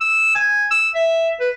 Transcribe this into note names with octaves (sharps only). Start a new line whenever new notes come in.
E6
G#5
E6
E5
B4